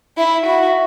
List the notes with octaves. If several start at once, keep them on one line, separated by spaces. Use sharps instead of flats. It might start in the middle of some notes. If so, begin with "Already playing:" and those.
E4 E5
F#4